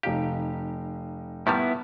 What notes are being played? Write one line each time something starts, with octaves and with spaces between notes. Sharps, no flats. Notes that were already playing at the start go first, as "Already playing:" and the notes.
F1 D#4 G4 F5
A2 D#3 G3 B3 E4